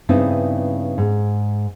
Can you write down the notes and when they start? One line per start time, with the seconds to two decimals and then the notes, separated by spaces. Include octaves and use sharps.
0.09 G2 C#3 B3 C4 D#4 E4
0.98 G#2